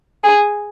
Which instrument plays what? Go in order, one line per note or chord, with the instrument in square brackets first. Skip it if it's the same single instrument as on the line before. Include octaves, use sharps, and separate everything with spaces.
[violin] G#4